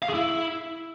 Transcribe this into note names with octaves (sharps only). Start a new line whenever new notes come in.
F5
G#4
E4